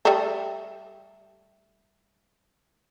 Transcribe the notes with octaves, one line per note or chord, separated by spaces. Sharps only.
G3 A3